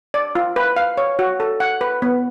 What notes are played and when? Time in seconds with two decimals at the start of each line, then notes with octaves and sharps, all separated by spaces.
0.14 D5
0.35 F4
0.56 B4
0.77 F5
0.98 C#5
1.19 F#4
1.40 A4
1.60 F#5
1.81 B4
2.02 B3